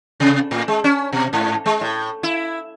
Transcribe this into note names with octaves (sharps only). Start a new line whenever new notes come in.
C3
A2
G#3
C#4
B2
G#2
G#3
A2
E4